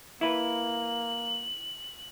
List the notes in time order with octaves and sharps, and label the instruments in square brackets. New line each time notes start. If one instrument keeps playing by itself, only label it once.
[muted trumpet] A#3 [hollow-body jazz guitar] E4 B4 [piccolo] F#7